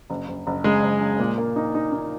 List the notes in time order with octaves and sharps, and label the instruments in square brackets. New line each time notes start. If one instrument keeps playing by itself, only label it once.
[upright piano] F#1
F#1
F#1
[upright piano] C#3 [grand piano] G#3 G#4
[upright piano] F#1
C#3
A#2
A#3
D#4
D#4
D#4